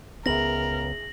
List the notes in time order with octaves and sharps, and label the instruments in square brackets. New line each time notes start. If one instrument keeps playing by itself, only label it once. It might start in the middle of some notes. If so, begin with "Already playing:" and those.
[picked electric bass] C#2 B3 [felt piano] G#4 E5 [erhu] A#4 [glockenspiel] A#6 F#7